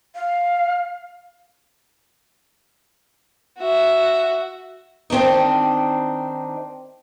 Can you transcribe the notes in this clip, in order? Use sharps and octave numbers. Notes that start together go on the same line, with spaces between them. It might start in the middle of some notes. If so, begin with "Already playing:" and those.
F5
F#4 E5
D#3 C4 D4 D#4